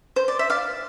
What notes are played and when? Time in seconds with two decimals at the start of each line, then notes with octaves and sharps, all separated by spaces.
0.16 C5
0.28 D5
0.39 E5
0.50 D5 F5